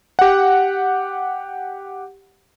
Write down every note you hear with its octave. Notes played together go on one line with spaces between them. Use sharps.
G4 F#5